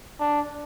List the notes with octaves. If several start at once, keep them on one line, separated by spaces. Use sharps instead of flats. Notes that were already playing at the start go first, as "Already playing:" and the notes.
D4